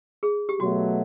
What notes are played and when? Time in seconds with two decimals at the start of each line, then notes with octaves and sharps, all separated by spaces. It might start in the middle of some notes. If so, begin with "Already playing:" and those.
0.23 G#4
0.49 G4
0.60 B2 F#3 A3 F#4